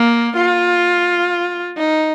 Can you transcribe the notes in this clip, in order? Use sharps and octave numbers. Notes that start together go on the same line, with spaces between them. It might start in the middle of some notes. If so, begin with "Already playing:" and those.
Already playing: A#3
F4
D#4